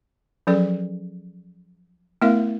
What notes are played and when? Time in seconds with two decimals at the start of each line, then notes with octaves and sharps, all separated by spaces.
0.47 F3 F#3 C#4 G#4 A4 D5
2.22 A3 B3 E4 A#4 E5 F5